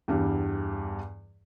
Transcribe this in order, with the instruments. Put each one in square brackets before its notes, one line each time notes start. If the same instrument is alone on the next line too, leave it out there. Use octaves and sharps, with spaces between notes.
[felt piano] E2 G2 G3